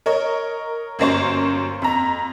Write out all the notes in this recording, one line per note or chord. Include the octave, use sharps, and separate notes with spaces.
A#4 C#5 D#5
G1 F#2 A#3 C5 C#6
F2 A#5